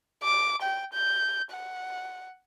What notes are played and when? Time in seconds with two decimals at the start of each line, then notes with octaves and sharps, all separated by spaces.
0.24 D6
0.62 G5
0.93 G6
1.51 F#5